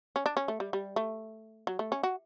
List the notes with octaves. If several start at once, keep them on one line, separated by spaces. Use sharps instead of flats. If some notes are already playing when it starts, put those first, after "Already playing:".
C#4
D4
C#4
A3
G3
G3
A3
F#3
A3
C#4
F#4